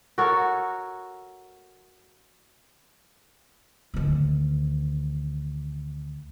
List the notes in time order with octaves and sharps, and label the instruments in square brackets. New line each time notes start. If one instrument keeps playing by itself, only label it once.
[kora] F#4 A4 A#4 C#5
[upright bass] D2 D#3